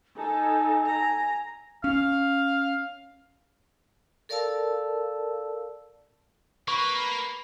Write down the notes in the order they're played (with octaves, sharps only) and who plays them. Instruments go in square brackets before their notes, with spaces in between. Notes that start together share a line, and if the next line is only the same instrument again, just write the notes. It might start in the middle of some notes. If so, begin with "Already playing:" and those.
[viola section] D#4 A4 [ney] G#5
[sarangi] A#5
[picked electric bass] C#4 [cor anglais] F5
[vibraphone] A4 A#4 D5 F5 A5 E6
[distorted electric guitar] A#3 [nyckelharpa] B4 [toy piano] C#6